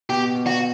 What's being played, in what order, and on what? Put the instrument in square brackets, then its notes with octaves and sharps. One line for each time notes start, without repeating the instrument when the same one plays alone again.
[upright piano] B2 [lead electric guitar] G4
[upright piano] B2
[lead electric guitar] F#4